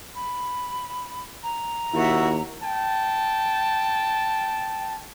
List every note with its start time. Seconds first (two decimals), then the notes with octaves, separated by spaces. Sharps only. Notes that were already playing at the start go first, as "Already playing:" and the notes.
0.15 B5
1.42 A#5
1.94 D#2 E4 F#4 E5
2.62 G5 A5